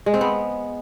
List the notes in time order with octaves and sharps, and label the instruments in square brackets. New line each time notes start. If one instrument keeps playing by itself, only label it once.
[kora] G#3
C4
B3